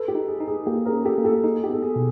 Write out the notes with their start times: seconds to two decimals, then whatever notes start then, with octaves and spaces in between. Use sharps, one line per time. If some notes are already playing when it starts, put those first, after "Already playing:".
Already playing: A4 B4
0.08 G4
0.15 D#4
0.28 G#4
0.41 D#4
0.47 G#4
0.66 A#3 G4 A4
0.86 G#4 A#4
0.92 C#4
1.05 G4 A4
1.18 A#3
1.24 G4 A4
1.44 D#4 G#4
1.63 G4
1.70 B3 A4
1.82 G#4
1.96 B2